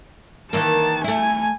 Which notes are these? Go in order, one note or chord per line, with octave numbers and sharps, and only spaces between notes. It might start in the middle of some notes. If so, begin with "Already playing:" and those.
D#3 E3 A#3 A5
A3 E4 G#5